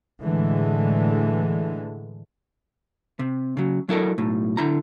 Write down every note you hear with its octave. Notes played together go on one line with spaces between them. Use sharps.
A2 D3 E3 G#3 A3
C3
C#3 F#3
F#3 E4 A4 A#4
B1 A2
D3 E4 A#5